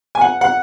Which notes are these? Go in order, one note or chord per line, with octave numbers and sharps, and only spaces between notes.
G#5
F#5
F#5